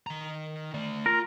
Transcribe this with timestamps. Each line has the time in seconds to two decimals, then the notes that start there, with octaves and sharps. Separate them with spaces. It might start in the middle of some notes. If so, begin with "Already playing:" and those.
0.07 D#3 A#5
0.74 A3 D5
1.06 F4 A#4